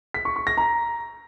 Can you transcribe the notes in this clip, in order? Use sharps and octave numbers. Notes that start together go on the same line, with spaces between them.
B6
C#6
C#6
A#6
A#5